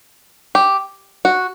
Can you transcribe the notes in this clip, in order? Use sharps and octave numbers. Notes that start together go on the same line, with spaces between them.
G4
F#4